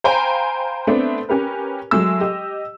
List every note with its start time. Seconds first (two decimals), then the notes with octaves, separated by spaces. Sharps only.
0.04 C5 F5 G5 G#5 A#5 B5
0.87 A3 B3 C4 D4
1.29 C#4 G4 A#4 B4
1.91 F#3 G#3 A3 E6
2.21 G4 D#5